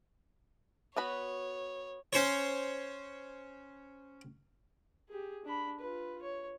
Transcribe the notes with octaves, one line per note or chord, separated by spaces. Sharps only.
B3 F#4 C#5 B5
C#4 C5 C#5
G4 G#4
D4 B5
F4 B4
C#5